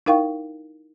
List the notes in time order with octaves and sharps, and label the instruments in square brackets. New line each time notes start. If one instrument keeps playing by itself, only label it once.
[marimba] D#4 E4 A#4 F5 G5 C#6